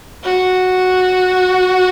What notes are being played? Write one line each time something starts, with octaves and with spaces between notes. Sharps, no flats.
F#4